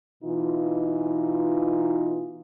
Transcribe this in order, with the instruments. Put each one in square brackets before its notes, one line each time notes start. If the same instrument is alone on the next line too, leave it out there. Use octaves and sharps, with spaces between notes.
[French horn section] B2 E3 D#4 F4